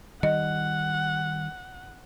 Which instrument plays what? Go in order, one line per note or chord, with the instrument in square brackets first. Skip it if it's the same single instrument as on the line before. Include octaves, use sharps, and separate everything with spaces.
[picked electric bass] D#3 G3 [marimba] D#5 [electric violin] F#5